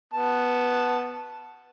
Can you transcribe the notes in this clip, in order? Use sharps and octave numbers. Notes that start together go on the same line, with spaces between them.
B3 A5